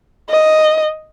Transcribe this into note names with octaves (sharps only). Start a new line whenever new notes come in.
D#5